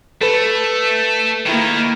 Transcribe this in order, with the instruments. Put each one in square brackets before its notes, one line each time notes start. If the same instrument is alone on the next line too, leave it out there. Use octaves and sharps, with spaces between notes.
[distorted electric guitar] A3 [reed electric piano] A4 B4
[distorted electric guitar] D#3 A#4 [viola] A#3 E4